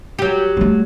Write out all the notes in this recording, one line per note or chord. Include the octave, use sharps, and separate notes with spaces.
F#3 G4
G3 A3